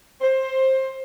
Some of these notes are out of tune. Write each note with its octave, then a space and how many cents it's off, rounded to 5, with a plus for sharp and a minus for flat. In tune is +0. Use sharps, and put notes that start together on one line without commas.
C5 +20